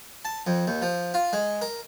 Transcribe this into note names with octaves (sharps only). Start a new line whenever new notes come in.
A5
F2
D#2
F3
F4
G#3
A#4